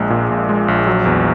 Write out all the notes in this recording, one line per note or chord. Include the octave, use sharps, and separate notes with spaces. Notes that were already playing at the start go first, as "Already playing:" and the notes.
Already playing: A#1 G#3
A#2
A#1
G#3
A#1
F#3
E2